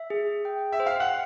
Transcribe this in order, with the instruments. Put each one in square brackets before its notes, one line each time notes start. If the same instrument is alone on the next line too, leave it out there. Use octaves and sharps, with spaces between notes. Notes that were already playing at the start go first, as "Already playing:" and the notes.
Already playing: [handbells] E5
G#4
G5
[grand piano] E5
[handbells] C5
[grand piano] F5
F#5